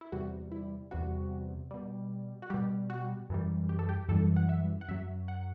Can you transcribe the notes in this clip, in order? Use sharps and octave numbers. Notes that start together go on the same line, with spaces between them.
E4
E2 C3 G3 F#4
E4
E2 C3 G3 F#4
B2 G3
F#4
B2 G3 G4
F#4
F#2 E3 G3
G4
A4
G4
F#2 E3 G3 A4
F#5
E5
F#5
F#2 F#3 E5
F#5